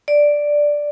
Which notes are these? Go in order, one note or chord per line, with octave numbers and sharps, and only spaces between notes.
D5